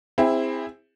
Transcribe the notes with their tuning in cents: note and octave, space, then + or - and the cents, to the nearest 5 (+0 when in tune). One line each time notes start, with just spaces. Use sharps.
C4 +0 E4 +0 G#4 -25